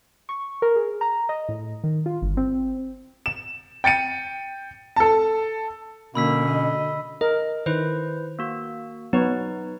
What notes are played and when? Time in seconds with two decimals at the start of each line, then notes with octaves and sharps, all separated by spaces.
0.29 C#6
0.62 A#4
0.76 G#4
1.01 A#5
1.29 D#5
1.49 A2
1.84 D#3
2.06 F4
2.22 G1
2.37 C4
3.26 E7
3.84 G5 A6 C#7 D#7
4.96 A4 A5
6.15 B2 D3 A#3 C#4 B5 E6 B6
6.49 D#5
7.21 A#4 D#5
7.66 D#3 E4 B4 C5
8.39 A#3 F#4
9.13 F#3 B3 D#4 B4 C#5